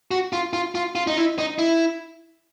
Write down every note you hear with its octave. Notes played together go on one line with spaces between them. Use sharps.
F#4
F4
F4
F4
F4
D#4
E4
D#4
E4